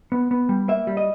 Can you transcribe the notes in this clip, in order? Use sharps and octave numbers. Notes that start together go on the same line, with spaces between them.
B3
B3
G3
A#3 E5
G3
D#5